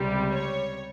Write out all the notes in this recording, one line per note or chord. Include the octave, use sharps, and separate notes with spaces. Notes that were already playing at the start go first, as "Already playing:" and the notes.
Already playing: C#2 C3 G3
C#5